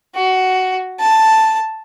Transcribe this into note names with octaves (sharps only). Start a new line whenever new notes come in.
F#4
A5